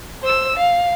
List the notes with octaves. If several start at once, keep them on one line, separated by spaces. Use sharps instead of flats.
C5 E6
F5